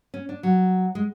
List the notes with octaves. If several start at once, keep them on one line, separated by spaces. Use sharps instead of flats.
C#4
D4
F#3
G#3